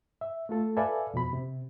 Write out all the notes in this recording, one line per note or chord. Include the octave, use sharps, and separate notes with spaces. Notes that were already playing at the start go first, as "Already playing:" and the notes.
E5
A3 F4 A4
A4 B4 D5 E5 F5 G#5
F2 B2 F3 B5
C3